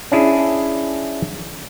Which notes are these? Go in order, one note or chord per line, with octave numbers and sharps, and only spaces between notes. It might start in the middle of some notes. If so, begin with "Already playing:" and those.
C#4 D4 E4 G#4